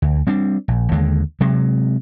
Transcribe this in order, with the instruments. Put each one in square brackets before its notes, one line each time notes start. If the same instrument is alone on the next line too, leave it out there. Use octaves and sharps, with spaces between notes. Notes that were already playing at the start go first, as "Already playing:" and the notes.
[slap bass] D2
G3 C4 D4
A#1
D#2 D3 G#3
C3 F#3 G#3